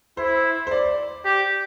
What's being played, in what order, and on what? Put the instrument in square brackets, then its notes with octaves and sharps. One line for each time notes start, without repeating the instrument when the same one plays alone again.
[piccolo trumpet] E4 [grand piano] C5
[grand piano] C5
D5
[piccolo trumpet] G4